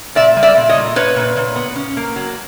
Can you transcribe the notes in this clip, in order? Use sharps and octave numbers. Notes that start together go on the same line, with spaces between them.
A#2 D5 E5
G3
D5 E5
A#2
C#5 D#5
A#2
A#2 B4 C#5
A#2
A#2
B3
C#4
A#3
F#3